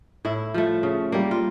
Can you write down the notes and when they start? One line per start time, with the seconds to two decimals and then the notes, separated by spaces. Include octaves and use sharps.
0.25 A2 E4
0.54 F3 A3
0.83 C#3
1.12 G3 A#3
1.31 F4